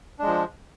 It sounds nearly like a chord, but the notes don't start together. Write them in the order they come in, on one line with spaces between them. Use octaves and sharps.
D4 G#3 F3